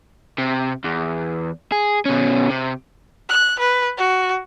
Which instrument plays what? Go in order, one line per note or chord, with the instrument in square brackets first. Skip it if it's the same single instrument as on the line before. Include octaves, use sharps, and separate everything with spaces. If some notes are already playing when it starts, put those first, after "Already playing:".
[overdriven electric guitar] C3
E2
G#4
B2 C#4
C3
[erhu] F#6
B4
F#4